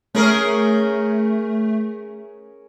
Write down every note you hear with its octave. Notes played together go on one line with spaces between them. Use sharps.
A3 C#4 G#4 A#4